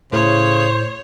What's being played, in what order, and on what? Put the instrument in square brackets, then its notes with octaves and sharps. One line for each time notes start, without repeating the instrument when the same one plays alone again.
[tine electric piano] A2 [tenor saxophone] C#3 [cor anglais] C5 [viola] C#5